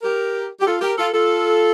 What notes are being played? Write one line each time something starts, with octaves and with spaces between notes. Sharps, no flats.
G4 A#4
G4
F4 A4
G4 A#4
F4 A4
F4 A4